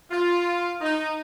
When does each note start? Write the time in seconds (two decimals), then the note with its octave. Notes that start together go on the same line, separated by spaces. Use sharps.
0.11 F4
0.81 D#4